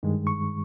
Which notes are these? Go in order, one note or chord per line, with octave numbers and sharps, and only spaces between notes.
G2 D#3 G#3
C#6